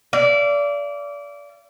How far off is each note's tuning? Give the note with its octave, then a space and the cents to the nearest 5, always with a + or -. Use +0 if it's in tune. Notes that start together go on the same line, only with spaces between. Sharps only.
D5 -25 F5 -45